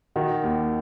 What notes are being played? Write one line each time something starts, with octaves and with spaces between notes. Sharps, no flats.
D#3 F#4
D#2